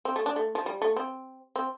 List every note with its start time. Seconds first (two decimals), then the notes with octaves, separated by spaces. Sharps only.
0.05 C4
0.16 A3
0.26 D4
0.36 A3
0.55 F3
0.66 G3
0.82 A3
0.96 C4
1.56 C4